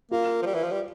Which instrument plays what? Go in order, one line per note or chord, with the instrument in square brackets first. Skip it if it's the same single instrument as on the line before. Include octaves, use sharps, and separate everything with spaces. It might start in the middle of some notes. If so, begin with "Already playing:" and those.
[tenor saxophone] A#3 [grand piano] F4
[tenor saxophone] F3
G3
E3
F3
G3